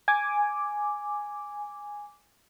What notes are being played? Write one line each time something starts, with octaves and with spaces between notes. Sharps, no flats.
G#5 D6